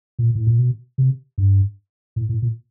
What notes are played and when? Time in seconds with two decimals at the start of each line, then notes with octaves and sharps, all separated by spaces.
0.19 A#2
0.35 A2
0.47 A#2
0.59 B2
0.98 C3
1.38 G2
2.16 A2
2.29 A2
2.42 A#2